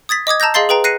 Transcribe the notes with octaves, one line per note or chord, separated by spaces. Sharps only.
D#6 G#6 A6 B6
D#5 D6 D#6 G#6
A5 A#5 E6 G6 A#6
G#4 D#5 F5 C6 A6 C7
G#4 B4 G5 A#5
F#6 A#6 C7 C#7 D#7